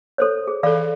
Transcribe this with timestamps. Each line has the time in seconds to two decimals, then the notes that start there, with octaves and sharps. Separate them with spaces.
0.18 A4 C5 C#5
0.47 G#4
0.63 E3 A4 D5 F5 B5